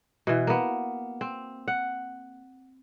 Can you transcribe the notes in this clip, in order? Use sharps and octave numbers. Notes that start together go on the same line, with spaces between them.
B2 E3
A#3 B3
C4
F#5